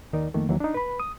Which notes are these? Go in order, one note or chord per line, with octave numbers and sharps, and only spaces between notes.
D#2 D#3 D#4 A#4 D5
F2 D#3 A3 A#3
D#2 E3 F#3
D4 D#4
B4 B5
D#6